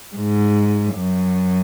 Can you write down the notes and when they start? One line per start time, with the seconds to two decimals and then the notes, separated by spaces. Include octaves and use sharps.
0.16 G#2
0.95 F#2